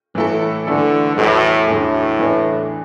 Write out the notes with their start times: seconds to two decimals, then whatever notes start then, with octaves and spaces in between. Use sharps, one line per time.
0.15 A2 E3 A3 E4 A4
0.67 D3 E3 A3 E4 A4
1.17 E2 A2 E3 B3 F#4
1.68 E2 A2 D3 F#3
2.19 E3 B3 D4